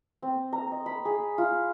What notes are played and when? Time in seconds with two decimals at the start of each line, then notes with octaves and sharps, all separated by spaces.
0.22 C4
0.53 A#5
0.72 D#5
0.86 B5
1.05 G#4
1.38 F4